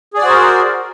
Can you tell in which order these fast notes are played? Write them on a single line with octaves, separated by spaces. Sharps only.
G#4 D5 F#4 C5 A#4